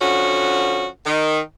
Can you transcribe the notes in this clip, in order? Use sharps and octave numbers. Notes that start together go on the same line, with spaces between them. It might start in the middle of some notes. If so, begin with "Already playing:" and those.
D3 F3 C#4 F#4
D#3